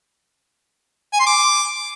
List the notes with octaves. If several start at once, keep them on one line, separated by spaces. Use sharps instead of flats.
G#5
C6
D6